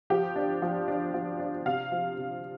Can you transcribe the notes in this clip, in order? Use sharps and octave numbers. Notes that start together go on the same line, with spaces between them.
F3 G4
D4
F3
D4
F3
D4
C3 F5
F3
C3